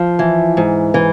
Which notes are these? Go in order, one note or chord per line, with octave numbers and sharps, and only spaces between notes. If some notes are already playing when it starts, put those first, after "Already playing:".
Already playing: F3
E3
G#2
E3